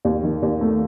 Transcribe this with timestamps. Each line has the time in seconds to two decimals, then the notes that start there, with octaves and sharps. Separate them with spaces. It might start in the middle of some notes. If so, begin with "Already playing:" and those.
0.05 D#2
0.23 D#3
0.42 D#2
0.61 A3